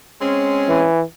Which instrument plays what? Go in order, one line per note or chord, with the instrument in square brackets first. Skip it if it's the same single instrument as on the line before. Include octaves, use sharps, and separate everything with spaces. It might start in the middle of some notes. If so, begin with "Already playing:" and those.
[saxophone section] G#3 C4 C#4
[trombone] E3